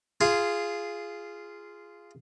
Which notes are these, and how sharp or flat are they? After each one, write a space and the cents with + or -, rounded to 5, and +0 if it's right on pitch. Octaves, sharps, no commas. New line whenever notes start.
F4 -10 G#4 +0